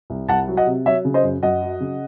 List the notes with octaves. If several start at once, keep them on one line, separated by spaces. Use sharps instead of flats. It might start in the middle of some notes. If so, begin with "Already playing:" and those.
C2
C2 F#5 A5
F#3
D#5 F#5
C3
F#3 C#5 E5
C#3
C5 D#5
F#2
F#2 D#5 F#5
F#3
C#3